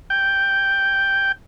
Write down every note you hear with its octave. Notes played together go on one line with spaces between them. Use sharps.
G5